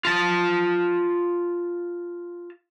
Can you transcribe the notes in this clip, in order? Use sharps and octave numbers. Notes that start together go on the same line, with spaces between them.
F4 A5